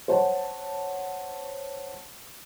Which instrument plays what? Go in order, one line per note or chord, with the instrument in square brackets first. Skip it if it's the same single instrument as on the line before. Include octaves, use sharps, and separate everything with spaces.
[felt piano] C5 C#5 F#5 A5